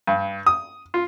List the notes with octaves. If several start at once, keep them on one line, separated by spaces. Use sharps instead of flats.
G2
D#6
F4